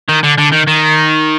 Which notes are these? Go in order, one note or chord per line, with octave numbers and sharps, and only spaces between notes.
D#3
D3
D3
D#3
D#3